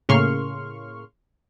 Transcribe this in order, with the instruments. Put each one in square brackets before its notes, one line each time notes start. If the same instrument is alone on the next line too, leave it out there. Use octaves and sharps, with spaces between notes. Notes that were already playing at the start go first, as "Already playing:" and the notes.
[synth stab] A2 C#3 A#3 C6 C#6 F6